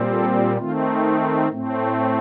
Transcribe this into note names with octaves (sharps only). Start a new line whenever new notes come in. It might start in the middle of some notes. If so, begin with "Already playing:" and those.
Already playing: A#2 G3 C4
A4
D#3 A3 C4 F4
D#4
A2 A3 C4